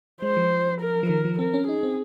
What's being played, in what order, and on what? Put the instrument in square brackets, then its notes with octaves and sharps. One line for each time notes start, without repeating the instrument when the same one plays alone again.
[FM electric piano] G#3 [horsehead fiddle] C5
[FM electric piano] F3
[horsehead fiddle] A#4
[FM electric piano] F3
[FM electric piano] D#3 [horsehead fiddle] A#4
[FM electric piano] F3
[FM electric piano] C4 [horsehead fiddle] A#4
[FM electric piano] C#4
[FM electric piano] D#4 [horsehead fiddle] G#4
[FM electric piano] C4